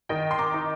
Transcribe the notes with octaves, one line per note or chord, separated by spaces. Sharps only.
D#3 D#5 G5
C6
A#5 D6
D#4